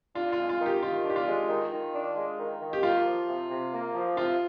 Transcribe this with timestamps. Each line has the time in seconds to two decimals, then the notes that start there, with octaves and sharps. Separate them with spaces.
0.15 D4 F4
0.32 F4
0.38 G#3
0.49 F4
0.60 D#3
0.66 G4
0.82 D#3 F4
1.05 D4
1.10 G4
1.16 F4
1.27 G#3
1.49 D#3
1.72 D#3
1.94 D4
2.16 G#3
2.38 D#3
2.61 D#3
2.73 G4
2.83 A#3 F4
3.06 F3
3.28 C3
3.50 C3
3.73 A#3
3.95 F3
4.17 C3 F4